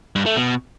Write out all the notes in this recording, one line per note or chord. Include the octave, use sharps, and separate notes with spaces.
G2
A3
B2